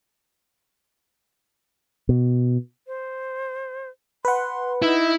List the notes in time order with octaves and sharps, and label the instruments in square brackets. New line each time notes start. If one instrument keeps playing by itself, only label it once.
[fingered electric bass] B2
[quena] C5
[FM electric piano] B4 F#5 [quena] C6
[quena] D#4 [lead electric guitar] E4